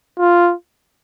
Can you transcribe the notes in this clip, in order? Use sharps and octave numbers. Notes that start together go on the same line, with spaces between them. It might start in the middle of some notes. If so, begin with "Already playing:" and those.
F4